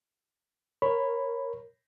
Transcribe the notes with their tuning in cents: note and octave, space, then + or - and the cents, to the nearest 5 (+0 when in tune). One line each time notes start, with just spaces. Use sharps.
A#4 +5 C#5 -15 B5 +10